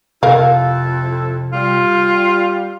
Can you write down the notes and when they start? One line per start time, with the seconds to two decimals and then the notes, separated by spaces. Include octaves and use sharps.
0.23 F2 C3 E4 A4 A#4 F5
1.53 G3 F4